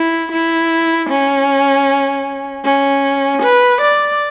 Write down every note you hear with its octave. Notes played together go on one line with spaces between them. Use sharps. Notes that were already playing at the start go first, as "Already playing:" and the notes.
Already playing: E4
E4
C#4
C#4
B4
D5